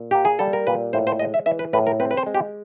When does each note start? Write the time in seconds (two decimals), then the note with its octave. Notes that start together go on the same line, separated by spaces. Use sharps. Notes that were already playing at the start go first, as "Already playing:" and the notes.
Already playing: A#2
0.11 A#3 G4
0.25 G#4
0.39 G3 A4
0.53 A#4
0.67 A#2 B4
0.93 A2 C5
1.07 C5
1.20 G#3 D#5
1.34 E5
1.46 E3 E5
1.59 B4
1.73 A2 B4
1.87 A#4
2.00 C4 B4
2.11 B4
2.17 C5
2.26 G#3
2.35 G4